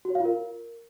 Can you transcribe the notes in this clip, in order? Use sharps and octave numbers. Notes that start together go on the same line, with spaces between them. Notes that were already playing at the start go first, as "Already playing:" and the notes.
F#4
C#5
F5
F4
A#4